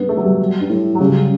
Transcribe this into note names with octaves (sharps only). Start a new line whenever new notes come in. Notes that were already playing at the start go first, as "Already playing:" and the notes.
Already playing: G2 B3
A3
F#3
G3
G2
A2
F#3
C#3 G3